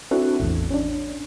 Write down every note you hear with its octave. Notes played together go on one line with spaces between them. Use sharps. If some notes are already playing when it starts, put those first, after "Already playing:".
C4 D4 E4 F#4 A4 F#5
A1 E2 A2
C#4 D4